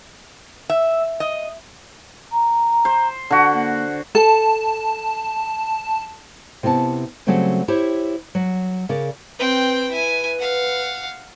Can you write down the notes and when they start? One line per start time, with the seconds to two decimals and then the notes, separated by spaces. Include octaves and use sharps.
0.70 E5
1.20 D#5
2.32 A#5
2.85 C5
3.31 D3 F#4 A5
3.53 A#3
4.15 A4 A5
6.63 C3 B3 E4 F5 A5
7.27 C#3 F#3 G3 A3 C4
7.68 E4 G4 C5 C#5
8.35 F#3
8.89 C#3 A#4 D5
9.39 C4 B4 G5
9.91 E4 G#5
10.39 F5 F#5